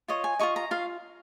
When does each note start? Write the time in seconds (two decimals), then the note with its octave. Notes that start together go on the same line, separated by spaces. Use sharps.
0.08 F4 C#5 D#5
0.24 G#5
0.39 F4 G#4 D#5 C#6
0.56 A#5
0.71 F4 F5